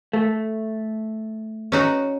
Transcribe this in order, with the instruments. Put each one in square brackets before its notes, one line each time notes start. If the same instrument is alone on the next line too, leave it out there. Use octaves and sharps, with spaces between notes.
[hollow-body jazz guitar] A3
[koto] C#4 D#4 F#4